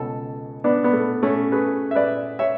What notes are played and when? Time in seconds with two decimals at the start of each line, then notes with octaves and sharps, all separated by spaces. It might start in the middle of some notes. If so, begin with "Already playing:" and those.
Already playing: C#2 B2 A4
0.64 B3 D4
0.84 B3
0.93 A3
1.23 A3 C#4
1.52 G#4 B4
1.91 E5
1.95 B4 D5
2.39 C#5 E5